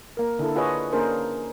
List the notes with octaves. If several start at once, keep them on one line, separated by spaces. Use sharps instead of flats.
A#3 A#4
D3 E4 A4
F4 G#4 B4 C#5 D#5
A#3 C#4 D4 G#4 A#4 C5